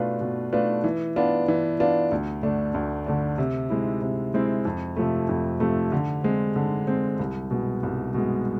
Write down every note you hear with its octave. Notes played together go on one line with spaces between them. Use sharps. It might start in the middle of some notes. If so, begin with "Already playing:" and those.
Already playing: B2 A3 D4 F4 B4
B2
A3 D4 F4 B4
E3
B3 D4 F4
E3
B3 D4 F4
D2
D3 A3 D4
D2
D3 A3 D4
C3
G#3 C4 E4
C3
G#3 C4 E4
F2
C3 F3 A3
F2
C3 F3 A3
D3
G#3 C4
D3
G#3 C4
C2
B2 G#3
C2
B2 G#3